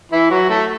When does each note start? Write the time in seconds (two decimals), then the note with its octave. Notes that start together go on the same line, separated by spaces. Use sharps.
0.12 E3 E4
0.30 F#3 F#4
0.49 A3 A4